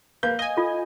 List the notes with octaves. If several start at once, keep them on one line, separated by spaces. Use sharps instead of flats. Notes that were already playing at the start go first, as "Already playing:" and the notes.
A#3 B4 F5 G6
D#5 G#5 G7
F4 A4